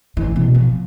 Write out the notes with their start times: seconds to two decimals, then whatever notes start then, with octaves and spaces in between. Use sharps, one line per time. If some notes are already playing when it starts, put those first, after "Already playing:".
0.17 E3
0.36 B2
0.55 F3